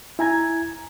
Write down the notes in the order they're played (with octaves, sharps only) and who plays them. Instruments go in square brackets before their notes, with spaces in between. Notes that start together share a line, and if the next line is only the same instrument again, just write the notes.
[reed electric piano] E4 G#5 A#5 G#6